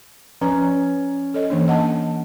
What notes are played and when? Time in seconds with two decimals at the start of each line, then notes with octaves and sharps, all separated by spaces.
0.41 F3 C#4 B4 A#5
1.34 A4 C#5 D#5
1.50 E3 A#3 D4
1.68 D#5 F#5 A5